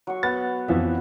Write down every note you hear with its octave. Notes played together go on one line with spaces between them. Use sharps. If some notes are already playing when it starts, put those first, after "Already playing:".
F#3 C#6
B3 A6
F2 E3 B3 E5